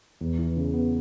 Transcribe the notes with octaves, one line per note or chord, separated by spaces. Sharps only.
E2
E3
C#3
B3